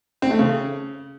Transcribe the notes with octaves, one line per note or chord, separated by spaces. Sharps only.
C4
A3
C#3